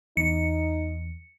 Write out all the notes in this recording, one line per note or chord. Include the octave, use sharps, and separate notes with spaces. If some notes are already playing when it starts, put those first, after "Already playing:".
E2 D#4 C#7